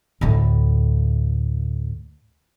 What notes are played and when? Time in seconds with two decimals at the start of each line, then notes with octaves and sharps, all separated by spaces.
0.21 D2 A2